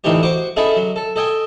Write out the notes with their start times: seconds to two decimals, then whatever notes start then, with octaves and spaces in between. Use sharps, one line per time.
0.04 D2 A2 E3 D#4 G4 C#5
0.23 F#4 C5 F#5 C#6 D6
0.57 C#4 D#4 E4 G#4 A4
0.77 F#3
0.96 A4
1.16 A4 D#5 G5 G#5